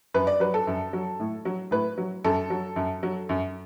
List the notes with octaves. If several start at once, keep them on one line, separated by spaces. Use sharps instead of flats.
F#2 B4
D5
F#3 B4
A4
F#2
F#3
A2
F#3
A2 B4
F#3
F#2 A4
F#3
F#2
F#3
F#2